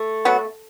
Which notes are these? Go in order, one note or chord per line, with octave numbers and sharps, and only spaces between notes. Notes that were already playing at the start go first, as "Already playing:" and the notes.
Already playing: A3
F#3 B3 F#4